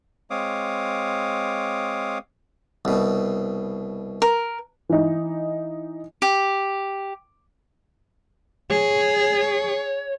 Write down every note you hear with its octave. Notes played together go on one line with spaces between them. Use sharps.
G#3 C4 C#5 F5 D6 D#6
C2 B2
A#4
E3 D#4
G4
G#4 C#5